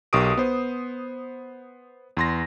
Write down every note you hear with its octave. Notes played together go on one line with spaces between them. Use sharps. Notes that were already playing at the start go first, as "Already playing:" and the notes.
B1 G4 A#4 C#6 D#6 D7
B3 C5
E2 C6 A#6